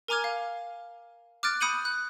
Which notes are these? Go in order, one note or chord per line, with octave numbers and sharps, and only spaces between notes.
A#4 G#5 A#5 D6 F6 G#6
F5
D6 F6 F#6 A6 D7
B5 D#6 G6 C#7 D#7 F#7
F#6